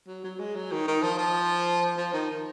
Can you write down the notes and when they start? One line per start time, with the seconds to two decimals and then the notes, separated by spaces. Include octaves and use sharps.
0.08 F#3
0.24 F#3
0.39 G#3
0.55 F#3
0.72 D#3
0.88 D#3
1.02 F3
1.18 F3
1.97 F3
2.13 D#3